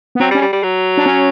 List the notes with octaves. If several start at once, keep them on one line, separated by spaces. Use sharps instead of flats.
B3
F#3 C4
G3
C#4
G3
G3
F#3
D4
C#4